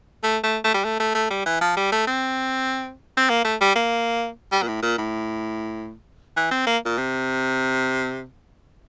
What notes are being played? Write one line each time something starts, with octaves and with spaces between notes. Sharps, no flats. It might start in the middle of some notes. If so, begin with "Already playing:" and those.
A3
A3
A3
G3
A3
A3
A3
G3
E3
F3
G3
A3
C4
C4
A#3
A3
G3
A#3
G3
A#2
A2
A#2
A2
E3
C4
A#3
A#2
C3